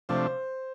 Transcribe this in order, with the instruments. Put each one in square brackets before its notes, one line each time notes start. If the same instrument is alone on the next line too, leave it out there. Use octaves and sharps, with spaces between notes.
[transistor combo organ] C3 F3 A3 D4 [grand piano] C5